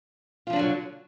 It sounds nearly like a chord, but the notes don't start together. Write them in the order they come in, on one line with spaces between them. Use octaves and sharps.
F4 F3 D4 D3 F#3